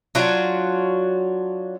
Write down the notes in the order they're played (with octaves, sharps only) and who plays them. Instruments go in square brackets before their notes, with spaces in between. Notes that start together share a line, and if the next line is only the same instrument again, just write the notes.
[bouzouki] F#3 D4 F4 F#4